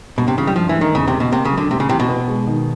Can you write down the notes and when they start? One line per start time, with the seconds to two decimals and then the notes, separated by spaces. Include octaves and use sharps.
0.18 G2 B2
0.28 C3
0.37 C#3 E3
0.47 G3
0.56 G2 F3
0.69 E3
0.76 A3
0.81 D#3
0.95 E2 C#3
1.08 C3
1.13 C#3
1.20 B2
1.32 C3 A#3
1.45 C#3
1.52 F#3
1.58 D3
1.71 A2 C3
1.80 C#3
1.89 C3 E3
2.00 B2
2.09 B3
2.28 G#3
2.47 D#3